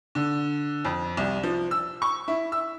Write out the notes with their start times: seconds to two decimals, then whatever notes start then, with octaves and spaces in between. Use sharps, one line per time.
0.15 D3
0.85 F2
1.17 C2
1.43 F3
1.71 E6
2.02 C#6
2.28 E4
2.52 E6